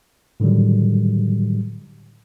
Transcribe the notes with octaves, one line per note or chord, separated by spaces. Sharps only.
A2 D3 D#3 F#3 G3